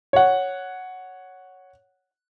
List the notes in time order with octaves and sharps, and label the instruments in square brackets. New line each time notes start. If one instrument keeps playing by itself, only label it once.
[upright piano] C#5 F#5